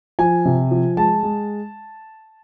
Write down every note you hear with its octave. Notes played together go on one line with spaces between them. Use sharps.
F3 G#5
C3
F3
G#3 A5
G#3